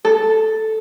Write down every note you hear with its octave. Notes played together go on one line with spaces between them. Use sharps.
A4